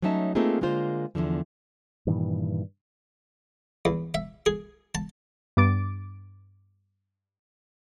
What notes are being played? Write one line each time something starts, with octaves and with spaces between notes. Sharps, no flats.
F#3 A3 C#4 D#4 E5 A5
A3 A#3 C4 D#4 F4 G#4
D3 G#3 A#3 F4 C5
E2 B2 D3 F3
G2 A#2 D#3 E3
E2
E5
G#4
A5
G2 B3 D6 A6 D7